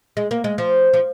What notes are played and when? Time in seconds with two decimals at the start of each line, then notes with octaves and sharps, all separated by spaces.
0.17 G#3
0.31 A#3
0.44 G#3
0.58 F3
0.93 F3